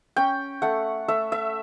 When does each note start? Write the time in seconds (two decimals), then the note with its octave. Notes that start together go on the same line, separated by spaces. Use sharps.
0.16 C#4 G5
0.62 A3 F#5
1.08 A3 E5
1.32 E5